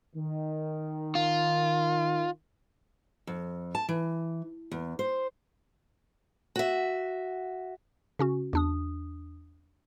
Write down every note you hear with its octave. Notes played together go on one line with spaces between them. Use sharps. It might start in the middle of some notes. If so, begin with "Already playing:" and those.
D#3
F4
F2
A5
E3
E2
C5
F#4 E5
C#3 C#4 F#4
E2 D4 D#6